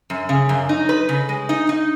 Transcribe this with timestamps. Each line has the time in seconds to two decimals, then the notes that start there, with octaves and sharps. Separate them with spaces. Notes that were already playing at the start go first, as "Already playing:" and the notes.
0.10 F#2
0.29 C#3
0.49 F#2
0.69 D#4
0.89 B4
1.09 C#3
1.29 G#3
1.49 D#4
1.69 D#4